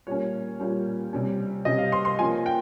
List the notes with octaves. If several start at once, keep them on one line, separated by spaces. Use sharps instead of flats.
A#2 G3 A#3 C#4 C#5
A#2 G3 A#3 C#4
C3 G3 C#4
C3 G3 C#4 D#5
F5
C6
C6
F3 A#3 C#4 G#5
G5